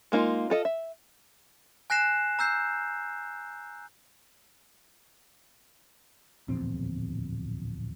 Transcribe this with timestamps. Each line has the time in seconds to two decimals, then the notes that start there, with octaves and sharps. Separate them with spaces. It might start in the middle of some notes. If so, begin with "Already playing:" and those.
0.12 G#3 A#3 D#4 F4
0.50 F4 A4 D#5
0.65 E5
1.90 G#5 F#6 A#6 C7 E7
2.39 A#5 E6 G6 C7
6.48 D1 A#1 E2 C4